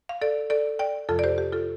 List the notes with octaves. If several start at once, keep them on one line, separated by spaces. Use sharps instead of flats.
F5
A4 D5
A4 D5
D5 G5
F2 C3 F3 F4 A4
D5
G4 C5
G4
F4 A4